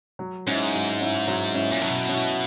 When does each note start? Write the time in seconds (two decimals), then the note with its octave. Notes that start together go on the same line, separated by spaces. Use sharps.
0.19 F#3
0.47 G#2 C#4 E4
0.73 F#3
1.00 C#4 E4
1.28 F#3
1.54 C#4 E4
1.72 A#2
1.82 B2 F#3
2.09 C#4 E4